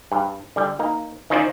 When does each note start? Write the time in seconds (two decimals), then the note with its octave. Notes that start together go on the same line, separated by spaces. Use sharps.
0.12 G2
0.56 D3 G3
0.79 A#3 D#4
1.30 D#3 C#4 D#4 F4 C5 D5